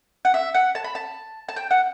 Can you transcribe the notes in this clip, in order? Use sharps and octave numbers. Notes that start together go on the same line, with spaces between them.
F#5
E5
F#5
A5
B5
A5
A5
G5
F#5